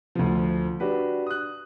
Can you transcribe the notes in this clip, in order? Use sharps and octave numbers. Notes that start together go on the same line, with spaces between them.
D2 F3
D4 F#4 G4 B4
D#6 F#6